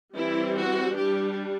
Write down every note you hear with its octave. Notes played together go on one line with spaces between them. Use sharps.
E3 G3 C4 E4
F#4
G3 D4 G4